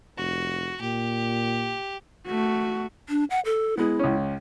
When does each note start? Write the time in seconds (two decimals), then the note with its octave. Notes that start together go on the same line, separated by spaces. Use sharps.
0.17 F1 F#4
0.81 A#2 G4
2.26 A3 F#4
3.09 D4
3.30 F#5
3.45 A4
3.77 G#3 B3 E4
3.99 C#2 C#4